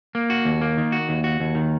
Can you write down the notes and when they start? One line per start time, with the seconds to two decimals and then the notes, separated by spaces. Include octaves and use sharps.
0.15 A#3
0.30 F#4
0.45 D#2
0.61 A#3
0.77 D#3
0.92 F#4
1.09 D#2
1.24 F#4
1.40 D#2
1.55 D#3